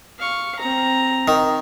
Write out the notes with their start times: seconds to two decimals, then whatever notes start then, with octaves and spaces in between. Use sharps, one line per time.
0.19 F5 C#6
0.59 C4 A#5
1.28 D#3